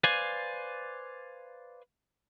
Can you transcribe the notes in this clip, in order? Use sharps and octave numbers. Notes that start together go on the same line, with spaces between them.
B4 C5 D5 F5 G#5